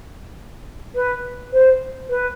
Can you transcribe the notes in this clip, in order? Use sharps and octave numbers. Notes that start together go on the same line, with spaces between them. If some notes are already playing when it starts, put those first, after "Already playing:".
B4
C5
B4